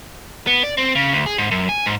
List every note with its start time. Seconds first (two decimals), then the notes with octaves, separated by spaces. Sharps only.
0.47 B3
0.64 D5
0.77 C4
0.95 C#3
1.13 D2
1.26 G#4
1.38 G#2
1.51 F#2
1.69 G#5
1.86 G#2